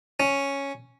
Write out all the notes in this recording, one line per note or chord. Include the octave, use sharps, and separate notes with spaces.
C#4